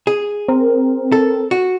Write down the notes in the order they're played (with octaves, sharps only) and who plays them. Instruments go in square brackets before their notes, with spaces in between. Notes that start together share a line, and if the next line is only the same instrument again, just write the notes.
[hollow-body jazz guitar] G#4
[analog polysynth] C4 A#4
[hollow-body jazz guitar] A4
F#4